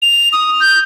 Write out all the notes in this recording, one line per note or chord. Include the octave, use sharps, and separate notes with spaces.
F7
D#6
G6